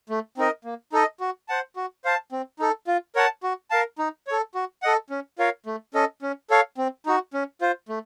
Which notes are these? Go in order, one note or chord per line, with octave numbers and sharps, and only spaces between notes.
A3
C4 D#4 A#4 D#5
A#3
D#4 A4 D#5
F#4
C5 F#5 A5
F#4
C5 F5 A5
C4
D#4 A4
F4
A#4 C#5 F#5 A5
F#4
A#4 F5 A5
D#4
A4 C#5
F#4
A4 D#5 F#5
C#4
F4 A#4 C#5 F5
A3
C#4 A4 D#5
C#4
A4 C#5 F5
C4
D#4 F#4
C#4
F4 C5
A3